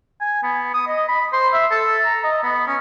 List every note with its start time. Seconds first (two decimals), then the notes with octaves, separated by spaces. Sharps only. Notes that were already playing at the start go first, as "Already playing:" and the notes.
0.20 G#5
0.43 B3
0.74 D#6
0.87 D#5
1.08 B5
1.33 C5
1.53 E5
1.71 A4
2.05 A#5
2.24 D#5
2.43 B3
2.67 C#4